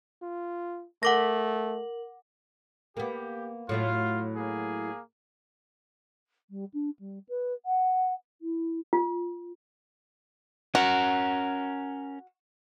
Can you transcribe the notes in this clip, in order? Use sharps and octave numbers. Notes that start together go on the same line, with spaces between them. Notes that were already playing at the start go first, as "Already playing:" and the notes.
F4
A3 A#4 F#5 D6 A#6 F#7
A#3 B3 G4
A2 F#3 A3 F4
A#3 G#4
G3
D4
G3
B4
F#5
E4
F4
C#4 F#4 A#4